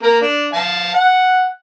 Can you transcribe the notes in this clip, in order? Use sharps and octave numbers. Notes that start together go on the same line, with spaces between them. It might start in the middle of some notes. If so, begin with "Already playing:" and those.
A#3 A#4
D4
F5 A5
F#5